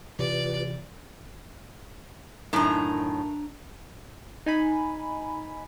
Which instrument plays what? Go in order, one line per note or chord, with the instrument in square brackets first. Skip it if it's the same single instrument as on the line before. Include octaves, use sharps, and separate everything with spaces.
[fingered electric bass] C3 E3 [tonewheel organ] F4 G4 B4 [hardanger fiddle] D5
[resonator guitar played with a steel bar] F#2 A2 D#3 [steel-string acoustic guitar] D4 A#5
[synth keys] D#4 G#5 B5